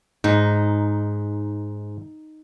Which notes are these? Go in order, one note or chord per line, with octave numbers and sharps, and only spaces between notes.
G#2 D#4